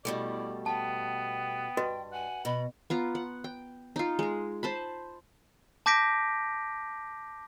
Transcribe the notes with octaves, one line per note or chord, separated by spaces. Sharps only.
B2 G3 A3 E4 D5
B3 G5 A5
G2 F#4 B4 D#5
F#5 G#5
B2 B5
B3 F4 A#5
F#5
G5
D#4 F4
G#3 A#5
C5 A5 B5
A5 D6 G6 A#6 B6 D7